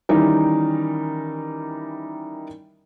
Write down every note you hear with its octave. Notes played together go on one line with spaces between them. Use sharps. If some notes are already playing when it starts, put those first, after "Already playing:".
D#3 E3 G3 C#4 D#4 A#4